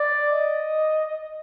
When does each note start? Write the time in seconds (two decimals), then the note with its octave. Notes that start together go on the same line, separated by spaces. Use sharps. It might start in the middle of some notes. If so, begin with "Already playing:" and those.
Already playing: D5
0.32 D#5